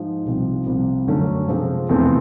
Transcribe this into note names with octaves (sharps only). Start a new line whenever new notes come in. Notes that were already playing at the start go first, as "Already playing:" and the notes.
Already playing: G#2 F3 D#4
C2 C3 F3
C2 C3 F3
F#2 D3 F#3 A3 C#4
C3 F3 G#3 C4
E2 C3 F3 A3 C4